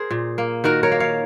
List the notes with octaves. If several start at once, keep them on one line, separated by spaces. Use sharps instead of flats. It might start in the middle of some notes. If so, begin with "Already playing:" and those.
Already playing: G#4 A#4 C5
A#2
A#3
D#3 F#4 A#4
A#4 C#5
A#3
C#5 F5